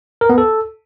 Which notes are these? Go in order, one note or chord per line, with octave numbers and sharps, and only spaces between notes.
A#4
B3
A4